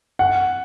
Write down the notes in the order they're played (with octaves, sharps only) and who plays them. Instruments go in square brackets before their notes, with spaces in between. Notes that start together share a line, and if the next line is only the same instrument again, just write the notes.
[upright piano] F#5